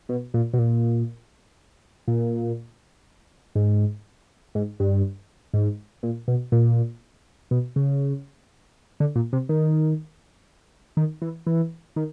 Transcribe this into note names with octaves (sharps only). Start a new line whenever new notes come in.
B2
A#2
B2
A#2
A#2
G#2
G#2
G2
G#2
A#2
B2
A#2
B2
C#3
D3
A#2
C3
D#3
D#3
E3
E3
D#3